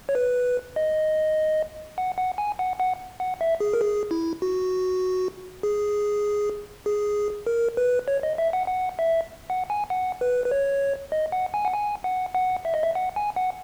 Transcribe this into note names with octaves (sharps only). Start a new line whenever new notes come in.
C#5
B4
D#5
F#5
F#5
G#5
F#5
F#5
F#5
E5
G#4
A#4
G#4
E4
F#4
G#4
G#4
A#4
B4
C#5
D#5
E5
F#5
F#5
E5
F#5
G#5
F#5
B4
B4
C#5
D#5
F#5
G#5
F#5
G#5
F#5
F#5
E5
D#5
E5
F#5
G#5
F#5